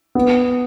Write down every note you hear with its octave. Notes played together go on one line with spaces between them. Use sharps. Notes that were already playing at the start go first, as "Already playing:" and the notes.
B3